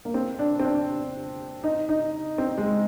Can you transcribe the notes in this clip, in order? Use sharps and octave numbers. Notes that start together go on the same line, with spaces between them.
A#3
C4
D4
C4
D4
D#4
D#4
C4
G#3